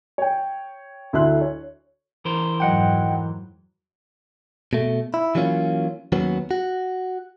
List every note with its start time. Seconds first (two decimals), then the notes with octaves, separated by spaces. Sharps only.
0.18 C#5 G5
1.13 D2 D3 E4 E5 C6 F#6
1.41 C#5
2.25 E3 A#4 C5
2.60 F2 G#2 F#3 D#5 F#5 G5
4.73 B2 A3
5.14 E4
5.35 E3 F#3 A#3 C#4 F4
6.12 D#2 F#3 B3 C#4
6.51 F#4